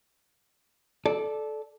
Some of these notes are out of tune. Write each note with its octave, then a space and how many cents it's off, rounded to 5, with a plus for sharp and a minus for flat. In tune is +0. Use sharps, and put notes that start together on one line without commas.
A4 -15 D5 +0